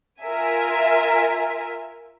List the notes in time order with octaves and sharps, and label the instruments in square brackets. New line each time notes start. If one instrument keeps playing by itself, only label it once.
[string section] F4 A#4 E5 G#5